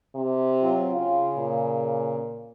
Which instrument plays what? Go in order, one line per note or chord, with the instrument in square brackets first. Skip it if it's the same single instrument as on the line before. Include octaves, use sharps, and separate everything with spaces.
[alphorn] C3
[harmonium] F#3 C4 F4
[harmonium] C#3 [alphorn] F4
[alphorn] A#2